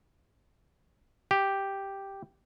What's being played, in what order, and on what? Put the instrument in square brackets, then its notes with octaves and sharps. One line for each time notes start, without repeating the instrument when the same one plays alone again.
[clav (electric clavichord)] G4